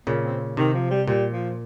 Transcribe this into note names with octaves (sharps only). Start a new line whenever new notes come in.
A#2 C#3 A#3
C4
C3 D#3
F3
G3
A#2 G3
F3